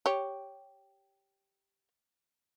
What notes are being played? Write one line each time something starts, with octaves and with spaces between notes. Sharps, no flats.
G4 C#5